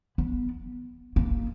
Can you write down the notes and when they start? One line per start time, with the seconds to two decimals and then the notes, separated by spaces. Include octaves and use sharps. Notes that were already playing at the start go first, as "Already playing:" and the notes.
0.18 B3
1.16 A#3